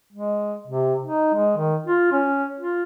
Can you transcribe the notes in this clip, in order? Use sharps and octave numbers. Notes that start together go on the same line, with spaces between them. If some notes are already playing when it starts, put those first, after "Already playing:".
G#3
C3
D#4
G#3
D#3
F4
C#4
F4